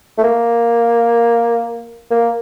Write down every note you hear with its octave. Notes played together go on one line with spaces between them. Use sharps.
A3
A#3
A#3